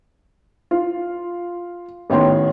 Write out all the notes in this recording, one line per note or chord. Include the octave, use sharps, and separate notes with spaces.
F4
A1 D#3 B3 C#5 G5 C6